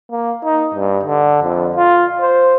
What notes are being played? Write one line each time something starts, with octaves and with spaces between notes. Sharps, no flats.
A#3
D#4
G2
D3
F2
F4
C5